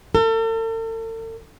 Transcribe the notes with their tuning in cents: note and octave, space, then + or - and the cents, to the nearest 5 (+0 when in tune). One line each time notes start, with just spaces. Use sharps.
A4 +40